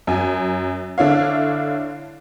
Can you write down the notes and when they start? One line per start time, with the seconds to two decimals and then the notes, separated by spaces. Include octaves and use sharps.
0.07 F#2 G#5
0.98 D3 D4 E4 C#5 F5